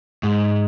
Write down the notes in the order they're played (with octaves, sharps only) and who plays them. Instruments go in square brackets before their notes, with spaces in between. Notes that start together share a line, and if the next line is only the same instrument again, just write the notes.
[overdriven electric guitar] G#2